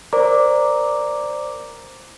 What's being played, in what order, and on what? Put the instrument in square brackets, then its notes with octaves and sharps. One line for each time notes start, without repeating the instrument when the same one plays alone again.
[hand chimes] A#4 C5 D5 A#5 D6